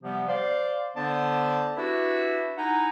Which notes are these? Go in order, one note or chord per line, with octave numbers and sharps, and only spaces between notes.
C3 F3 G3 B3
C5 D5 F5
D3 B3 D4 C5 D5 A5
D4 E4 F#4 G4 B4 E5
D#4 E4 F#5 G#5 A#5